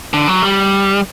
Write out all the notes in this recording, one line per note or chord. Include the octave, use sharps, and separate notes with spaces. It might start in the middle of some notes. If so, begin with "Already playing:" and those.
D3
F#3
G3